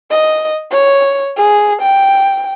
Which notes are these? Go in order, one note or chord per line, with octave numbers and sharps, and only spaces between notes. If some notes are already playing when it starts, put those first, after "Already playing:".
D#5
C#5
G#4
G5